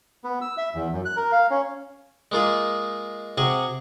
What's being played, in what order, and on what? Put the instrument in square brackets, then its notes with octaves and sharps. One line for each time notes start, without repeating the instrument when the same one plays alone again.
[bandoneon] B3
E6
E5
E2
F#2
F#6
A#4
F5
C#4
[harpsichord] G#3 A#3 F4 G#4
C3 F#4 G#4 C#6